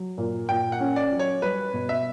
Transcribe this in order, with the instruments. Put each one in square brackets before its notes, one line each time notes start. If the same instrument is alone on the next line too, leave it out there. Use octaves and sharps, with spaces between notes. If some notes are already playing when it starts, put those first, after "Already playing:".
Already playing: [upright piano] F#3
A#2
[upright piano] A#2 [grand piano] G5
[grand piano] F#5
[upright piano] C#4
[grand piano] D5
[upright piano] F#3
[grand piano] C#5
[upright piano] G3 [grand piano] B4
[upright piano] B2
[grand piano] E5